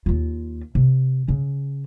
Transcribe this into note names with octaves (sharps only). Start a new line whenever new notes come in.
D#2 F4
C3
C#3